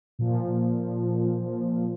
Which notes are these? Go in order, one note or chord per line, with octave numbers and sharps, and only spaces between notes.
A#2 F3